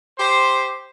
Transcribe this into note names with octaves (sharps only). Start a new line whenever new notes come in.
G4 C5